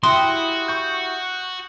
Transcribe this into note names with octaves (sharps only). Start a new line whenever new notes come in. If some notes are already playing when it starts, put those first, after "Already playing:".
E4 F#4 G4 C6 D#6
C#6 G6